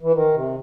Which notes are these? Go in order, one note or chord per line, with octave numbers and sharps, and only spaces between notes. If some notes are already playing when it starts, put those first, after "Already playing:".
E3
D#3
C3